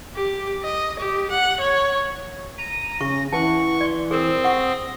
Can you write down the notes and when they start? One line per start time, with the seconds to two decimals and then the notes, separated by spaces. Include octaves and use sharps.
0.16 G4
0.63 D#5
0.99 G4
1.30 F#5
1.60 C#5
2.58 A#5 D#7
3.01 C#3 C#6 A#6
3.33 E3 F#5 A5 C#6
3.81 D5 C6
4.11 C4 G#4 A#4 D#6
4.44 F#5 C#6 A#6